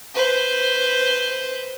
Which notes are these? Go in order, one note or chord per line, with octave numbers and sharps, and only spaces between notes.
B4 C5